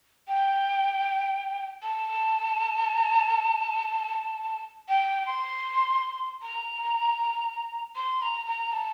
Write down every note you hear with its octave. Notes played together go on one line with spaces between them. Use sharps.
G5
A5
G5
C6
A#5
C6
A#5
A#5
A5